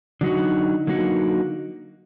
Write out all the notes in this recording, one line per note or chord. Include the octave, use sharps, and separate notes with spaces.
D3 F#3 A#3 D#4 F#4
D3 F#3 A#3 D#4 F#4